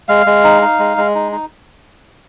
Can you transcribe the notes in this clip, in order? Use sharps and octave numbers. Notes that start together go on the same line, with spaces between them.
G#3 F5
G#3
D#4
D#4
G#3
G#3
D#4
D#4